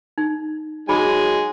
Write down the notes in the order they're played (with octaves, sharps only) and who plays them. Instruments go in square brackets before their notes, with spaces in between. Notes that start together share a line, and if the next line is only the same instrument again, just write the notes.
[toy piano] D#4
[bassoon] F#3 [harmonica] G#3 G#5 [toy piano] D#4 G#4 B5